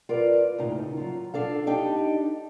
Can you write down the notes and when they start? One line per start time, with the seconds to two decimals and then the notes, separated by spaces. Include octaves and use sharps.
0.09 F4 A#4 B4 D5
0.58 D#2 A2 C#3 D#4
0.97 F#3 F4
1.34 D4 A4 F5
1.67 D4 D#4 G4